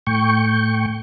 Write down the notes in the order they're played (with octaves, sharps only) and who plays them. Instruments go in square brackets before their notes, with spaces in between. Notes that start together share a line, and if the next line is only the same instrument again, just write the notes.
[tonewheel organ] A2 G5 C#6